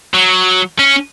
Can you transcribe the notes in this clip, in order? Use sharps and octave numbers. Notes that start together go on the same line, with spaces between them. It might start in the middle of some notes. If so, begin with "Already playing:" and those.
F#3
C#4